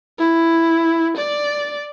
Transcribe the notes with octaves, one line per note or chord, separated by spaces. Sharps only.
E4
D5